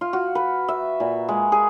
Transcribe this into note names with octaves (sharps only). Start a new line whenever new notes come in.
F4
F#4
B4
E5
A#2
G#3
G#4